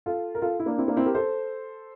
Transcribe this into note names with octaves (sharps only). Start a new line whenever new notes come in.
F4 A4
A#4
F4 A4
E4
A#3 D4
C4 E4
A#3 D4
C4 E4
G4 A#4
A4 C5